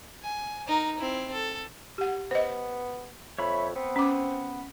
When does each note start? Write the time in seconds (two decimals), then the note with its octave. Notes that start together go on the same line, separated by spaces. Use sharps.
0.22 G#5
0.67 D#4 A#4
0.98 C4 E4
1.32 A4
1.98 G4 F#5
2.31 B3 C5 D#5
3.39 F2 C#5 E5 B5
3.76 B3 C4
3.96 C#4 D6